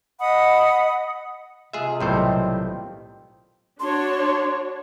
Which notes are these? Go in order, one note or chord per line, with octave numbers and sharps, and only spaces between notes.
D#5 F#5 B5 D#6
C3 G#3 F4 G#4 E5
B1 A2 D#3 G3 C4 C5
D4 F#4 C#5 C6